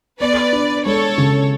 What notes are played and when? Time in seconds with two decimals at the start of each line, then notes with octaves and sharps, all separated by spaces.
0.20 B3 B4 D5
0.52 D4
0.85 G#3 A4 C#5
1.18 C#3